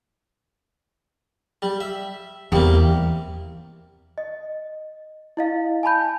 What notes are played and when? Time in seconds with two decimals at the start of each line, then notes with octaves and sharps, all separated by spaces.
1.62 G3
1.81 E5
2.52 E2 C3 G3 A#3
4.18 D#5
5.37 E4 D#5 F5
5.83 G#5 A5 B5 G6